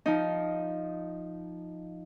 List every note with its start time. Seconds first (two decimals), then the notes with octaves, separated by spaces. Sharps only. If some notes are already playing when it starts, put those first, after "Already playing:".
0.06 F3 D#4